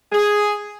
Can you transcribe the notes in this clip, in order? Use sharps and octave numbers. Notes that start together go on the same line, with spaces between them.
G#4